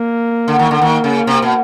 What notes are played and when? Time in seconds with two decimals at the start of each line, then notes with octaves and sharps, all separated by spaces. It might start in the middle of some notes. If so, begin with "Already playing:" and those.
Already playing: A#3
0.48 D3
0.59 D#3
0.71 D3
0.81 D#3 A#3
1.04 C#3
1.27 C3
1.42 B2